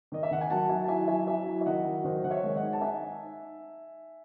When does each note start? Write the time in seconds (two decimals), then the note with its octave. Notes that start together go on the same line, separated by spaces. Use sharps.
0.12 D#3 D#5
0.23 E5
0.31 D#3 F#5
0.41 G#5
0.50 F#3 F#5 A5
0.69 F#3 E5 G#5
0.84 A5
0.88 E4 E5 G#5
1.08 F#3 E5 G#5
1.27 F#3 E5 G#5
1.47 E4
1.61 E5
1.66 D#3 D#5 F#5
1.86 F#3
2.04 D#3 C5 D#5
2.24 D#3 F#5
2.31 C#5 E5
2.43 G#3
2.56 D#5 F#5
2.62 D#4
2.73 A5
2.81 D#4 E5 G#5